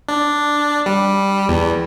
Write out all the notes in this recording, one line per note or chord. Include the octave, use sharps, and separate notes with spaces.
D4
G3
E2